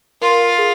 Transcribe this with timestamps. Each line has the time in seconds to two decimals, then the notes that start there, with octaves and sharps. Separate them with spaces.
0.21 F4 A#4
0.58 G#4